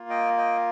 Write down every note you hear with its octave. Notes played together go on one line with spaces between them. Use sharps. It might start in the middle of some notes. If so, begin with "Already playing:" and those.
Already playing: A#3 F4
D#5 G5
D#5 G5